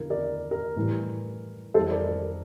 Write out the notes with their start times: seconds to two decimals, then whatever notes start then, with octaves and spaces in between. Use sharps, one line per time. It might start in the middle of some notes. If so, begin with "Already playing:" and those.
Already playing: E2 D3 F3 A#4
0.10 A#4 D5
0.51 A#4
0.76 A2 E3 G3
1.74 F2 E3 G3 A4 C5
1.91 A#4 D5
2.08 A#4